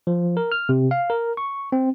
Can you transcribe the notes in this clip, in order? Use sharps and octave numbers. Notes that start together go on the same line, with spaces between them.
F3
A#4
F6
C3
F5
A#4
C#6
C4